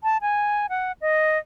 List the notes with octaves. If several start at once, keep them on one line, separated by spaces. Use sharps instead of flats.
A5
G#5
F#5
D#5